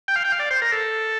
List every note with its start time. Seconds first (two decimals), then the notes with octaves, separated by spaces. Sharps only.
0.08 G5
0.16 F5
0.25 G5
0.32 F5
0.40 D5
0.51 C5
0.62 A#4
0.72 A4